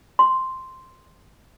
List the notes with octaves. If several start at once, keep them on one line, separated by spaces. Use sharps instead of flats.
C6